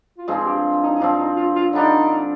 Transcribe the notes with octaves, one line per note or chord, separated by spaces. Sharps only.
F4
G2 F3 G#3 C4 D#4
G4
D#4
D#4
G2 F3 C4 D4
D#4
F4
F4
D3 G3 D4 D#4 G4